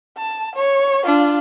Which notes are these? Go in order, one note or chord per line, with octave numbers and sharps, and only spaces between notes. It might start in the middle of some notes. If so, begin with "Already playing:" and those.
A5
C#5
D4 F4